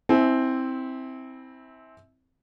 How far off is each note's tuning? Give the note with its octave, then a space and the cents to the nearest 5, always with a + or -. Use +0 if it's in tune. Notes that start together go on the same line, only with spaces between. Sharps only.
C4 +0 E4 -25 G#5 +35